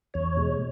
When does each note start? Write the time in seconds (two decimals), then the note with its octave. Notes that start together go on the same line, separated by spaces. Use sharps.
0.14 E2 C#5
0.37 B2 G#3